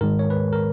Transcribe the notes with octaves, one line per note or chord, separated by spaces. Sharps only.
G#2 D#3 G#3 A#4
C#5
B4
A#4